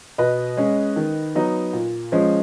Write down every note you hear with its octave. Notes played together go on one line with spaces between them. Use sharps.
B2 B4 D#5
G#3 C#4
D#3
F#3 B3 D#4
A#2
F3 G#3 C#4